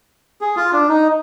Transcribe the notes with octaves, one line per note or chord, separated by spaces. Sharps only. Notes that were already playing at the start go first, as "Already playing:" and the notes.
G#4
F4
D4
D#4